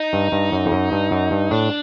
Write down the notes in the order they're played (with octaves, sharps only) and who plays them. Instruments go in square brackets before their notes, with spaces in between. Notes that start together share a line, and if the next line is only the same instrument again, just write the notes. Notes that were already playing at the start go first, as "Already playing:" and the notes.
Already playing: [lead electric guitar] D#4
[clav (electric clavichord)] G2
G2
F#2
F2
F#2
G2
F#2
G2
[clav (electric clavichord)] A2 [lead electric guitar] D4